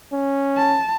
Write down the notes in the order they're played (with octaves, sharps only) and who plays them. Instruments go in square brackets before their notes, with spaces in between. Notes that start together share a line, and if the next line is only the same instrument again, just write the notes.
[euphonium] C#4
[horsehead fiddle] A5